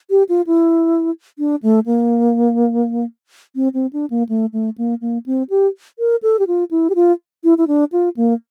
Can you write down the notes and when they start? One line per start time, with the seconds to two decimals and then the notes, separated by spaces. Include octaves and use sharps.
0.10 G4
0.29 F4
0.47 E4
1.39 D4
1.63 A3
1.86 A#3
3.55 C4
3.74 C4
3.93 D4
4.10 A#3
4.29 A3
4.53 A3
4.78 A#3
5.01 A#3
5.26 C4
5.50 G4
5.99 A#4
6.22 A4
6.39 G4
6.47 F4
6.71 E4
6.90 G4
6.95 F4
7.44 E4
7.58 E4
7.67 D4
7.92 F4
8.16 A#3